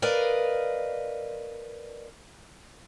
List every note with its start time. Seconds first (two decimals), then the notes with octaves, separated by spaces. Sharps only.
0.02 A#4 B4 D5 D#5 F5